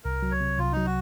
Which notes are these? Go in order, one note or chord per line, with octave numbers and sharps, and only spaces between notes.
C2 A#4
F#3
C#5
C3
C2 F4
F#3 D#4
F#4